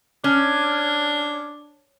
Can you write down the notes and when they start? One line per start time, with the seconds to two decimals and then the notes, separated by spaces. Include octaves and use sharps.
0.24 C#4 D4